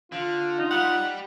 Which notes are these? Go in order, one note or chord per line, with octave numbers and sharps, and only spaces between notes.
D3 F4
D#4
G3 F#5